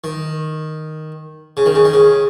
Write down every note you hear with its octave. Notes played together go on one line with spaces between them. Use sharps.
D#3
C#3
D#3
C#3
D#3
C#3